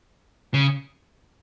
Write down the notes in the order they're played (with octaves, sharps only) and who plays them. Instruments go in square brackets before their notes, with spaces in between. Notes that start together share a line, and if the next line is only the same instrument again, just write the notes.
[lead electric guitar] C#3